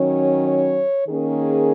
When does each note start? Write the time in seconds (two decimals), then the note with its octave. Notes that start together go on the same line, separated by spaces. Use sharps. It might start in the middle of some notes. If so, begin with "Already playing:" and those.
Already playing: D#3 F#3 C#4 C#5
0.44 C#5
1.08 D#3 A#3 C#4 G#4